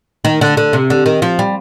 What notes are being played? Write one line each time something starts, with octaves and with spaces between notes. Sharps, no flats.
D#3
D3
D3
C3
D3
D#3
F3
G3